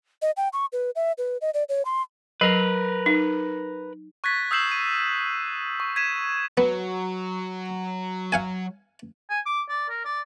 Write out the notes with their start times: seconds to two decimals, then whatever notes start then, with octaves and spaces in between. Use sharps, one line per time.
0.22 D#5
0.37 G5
0.53 C#6
0.73 B4
0.96 E5
1.18 B4
1.41 D#5
1.54 D5
1.69 C#5
1.85 C6
2.41 F#3 A#4 B4
3.06 D#4
4.24 C#6 F#6 G#6 A6 B6
4.51 D#6 E6 G6 C7 E7 F#7
4.71 D#7
5.80 C#6
5.96 G#6 B6 D#7 E7
6.58 F#3 B3
8.32 F5 F#5 G#5
9.30 G#5
9.46 D6
9.69 D5
9.89 A#4
10.05 D5